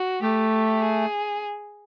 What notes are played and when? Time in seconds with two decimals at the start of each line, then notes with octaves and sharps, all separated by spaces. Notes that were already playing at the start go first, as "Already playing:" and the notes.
Already playing: F#4
0.22 A3 G4
0.81 G#4